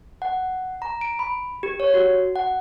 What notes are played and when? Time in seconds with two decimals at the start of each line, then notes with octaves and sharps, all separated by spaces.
0.22 F#5
0.82 A#5
1.01 D7
1.19 B5
1.63 G4
1.80 C#5
1.94 F#4
2.36 F#5